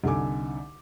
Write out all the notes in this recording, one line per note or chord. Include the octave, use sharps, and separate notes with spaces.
C2 D3 D#4 A4 G#5 D6